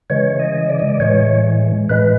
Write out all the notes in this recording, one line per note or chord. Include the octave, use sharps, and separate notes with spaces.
C#3 E3 G#3 C#5
D#5
D5
D#5
D5
A2 E3 G#3 C#5
A2 E3 G#3 B4